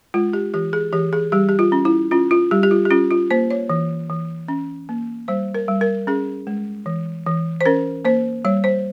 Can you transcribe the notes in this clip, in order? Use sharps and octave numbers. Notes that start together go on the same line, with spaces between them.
G#3 F4
G4
E3 G4
G#4
E3 G4
G#4
G3 G4
G4
F4
C#4
E4
C#4 F4
F4
G3 G4
G4
F4
G4
C#4 F4
F4
A#3 C5
C#5
E3
E3
C#4
A#3
G3 C5
A#4
G3
A#4
C#4 G#4
G#3
E3
E3
C5
C#4 A#4
A#3 C5
G3 C#5
C5